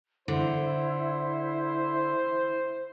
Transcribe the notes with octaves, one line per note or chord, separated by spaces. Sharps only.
D3 E4 C5